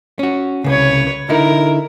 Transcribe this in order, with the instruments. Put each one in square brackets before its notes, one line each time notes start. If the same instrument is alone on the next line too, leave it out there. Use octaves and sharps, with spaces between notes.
[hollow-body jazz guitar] C#4 F#4
[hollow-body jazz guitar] C2 C#3 [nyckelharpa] B4 C#5
[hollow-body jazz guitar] D3 D#4 E4 [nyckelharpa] A#4